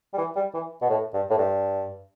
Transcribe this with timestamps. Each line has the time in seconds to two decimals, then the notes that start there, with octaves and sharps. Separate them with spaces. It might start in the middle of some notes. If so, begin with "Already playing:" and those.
0.13 G3
0.18 E3
0.36 G3
0.54 E3
0.82 B2
0.90 A2
1.14 G2
1.30 A2
1.38 G2